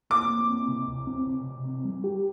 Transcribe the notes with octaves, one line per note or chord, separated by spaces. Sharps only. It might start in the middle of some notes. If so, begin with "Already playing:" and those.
A#3 D6
A#3
C4
C3
D2
C4
C3
C3
C4
G3
G4